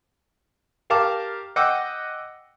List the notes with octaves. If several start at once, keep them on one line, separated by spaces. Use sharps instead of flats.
G4 A#4 F5 A5 D6
D#5 F#5 G5 D6 E6